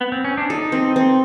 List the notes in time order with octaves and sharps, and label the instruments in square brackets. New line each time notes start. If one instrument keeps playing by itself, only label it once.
[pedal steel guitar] B3
C4
C#4
D4
[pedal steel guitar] D#4 [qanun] A4
[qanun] C4
C4